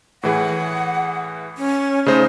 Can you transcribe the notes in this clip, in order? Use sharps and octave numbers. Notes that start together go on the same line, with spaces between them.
A2 E3 G#4 F#5
C#4
C#3 A3 D#4 C5